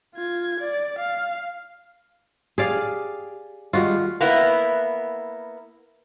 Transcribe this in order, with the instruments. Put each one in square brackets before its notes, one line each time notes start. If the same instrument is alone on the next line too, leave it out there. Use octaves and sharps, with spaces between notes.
[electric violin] F4 G#6
D5
F5
[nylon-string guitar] G4 [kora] G#4 D5 F5
[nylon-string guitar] D#2 G3 G#3 [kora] F4 F#4
[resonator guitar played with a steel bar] A#3 B3 E4